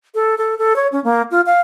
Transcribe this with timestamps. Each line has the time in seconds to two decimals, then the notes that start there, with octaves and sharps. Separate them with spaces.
0.15 A4
0.38 A4
0.58 A4
0.76 C#5
0.92 C#4
1.04 A#3
1.31 F4
1.46 F5